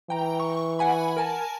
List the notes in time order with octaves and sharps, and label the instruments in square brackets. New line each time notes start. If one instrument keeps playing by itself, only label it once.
[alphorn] E3 [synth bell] G5 A#5
[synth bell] C#6
F#5 G#5 B5
A#4 G#5 A5